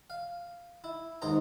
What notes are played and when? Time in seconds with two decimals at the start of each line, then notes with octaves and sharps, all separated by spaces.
0.10 F5
0.84 E4
1.22 D#2 G#2 G#4 C5 A#5